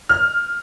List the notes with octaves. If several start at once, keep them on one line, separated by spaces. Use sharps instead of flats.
F6